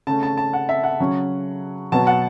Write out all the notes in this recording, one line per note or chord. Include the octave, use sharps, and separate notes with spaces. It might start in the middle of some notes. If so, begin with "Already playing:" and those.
C#3 A3 C#4 A5
A5
A5
F#5
E5
F#5
C#3 F#3 C#4
B2 F#3 B3 A5
F#5